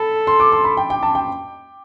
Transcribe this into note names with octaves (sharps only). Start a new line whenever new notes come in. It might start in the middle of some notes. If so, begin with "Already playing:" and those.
Already playing: A4 B5
C6
D6
C6
B5
G5
G5
A5
G5